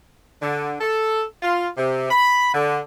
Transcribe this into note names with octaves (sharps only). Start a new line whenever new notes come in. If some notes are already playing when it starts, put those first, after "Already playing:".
D3
A4
F4
C3
B5
D3